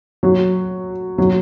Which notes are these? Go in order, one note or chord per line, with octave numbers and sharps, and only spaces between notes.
F#3
F#3